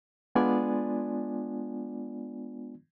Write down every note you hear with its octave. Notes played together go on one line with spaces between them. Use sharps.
G#3 B3 D4 F4 D5 G#5